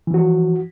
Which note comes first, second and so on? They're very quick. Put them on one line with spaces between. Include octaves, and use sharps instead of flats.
E3 F3 F#4